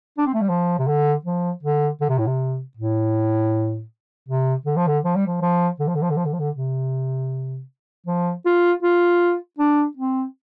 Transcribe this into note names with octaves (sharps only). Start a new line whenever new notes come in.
D4
C4
A3
G3
F3
C3
D3
F3
D3
D3
C3
A2
C3
A2
C3
D3
F3
D3
F3
G3
F3
F3
D3
F3
D3
F3
D3
F3
D3
F3
D3
C3
F3
F4
F4
D4
C4